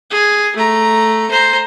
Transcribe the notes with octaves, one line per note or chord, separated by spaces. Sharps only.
G#4
A3 A#5
C5 A#5